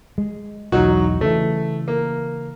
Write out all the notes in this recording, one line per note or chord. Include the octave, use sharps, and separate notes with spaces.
G#3
B1 E2 F#3 D#4 F#4
C#3 E3 A3
A#3